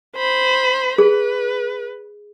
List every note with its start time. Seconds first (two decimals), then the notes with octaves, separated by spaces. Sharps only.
0.16 C5 B5
0.98 G#4 B4